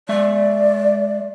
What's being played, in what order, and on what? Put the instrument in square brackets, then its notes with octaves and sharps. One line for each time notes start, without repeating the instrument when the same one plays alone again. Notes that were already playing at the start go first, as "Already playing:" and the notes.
[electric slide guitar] G#3 E5 [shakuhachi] D5